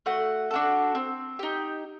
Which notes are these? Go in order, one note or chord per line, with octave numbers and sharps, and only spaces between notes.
A3 F#4 F#5
D4 F#4 A4
C4
D#4 G4